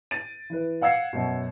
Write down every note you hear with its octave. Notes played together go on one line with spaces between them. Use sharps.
A6 D7 D#7
E3 B4
F5 F#5 E6 G#6 C7 C#7
F#2 B2